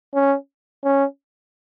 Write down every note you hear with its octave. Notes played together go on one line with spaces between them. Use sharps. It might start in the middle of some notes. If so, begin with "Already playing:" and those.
C#4
C#4